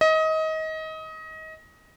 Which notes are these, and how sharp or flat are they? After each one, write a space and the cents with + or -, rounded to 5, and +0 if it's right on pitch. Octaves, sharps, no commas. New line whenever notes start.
D#5 +25